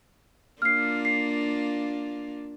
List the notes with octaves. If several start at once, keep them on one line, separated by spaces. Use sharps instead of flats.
A#3 D4 F4 F6 C7
C7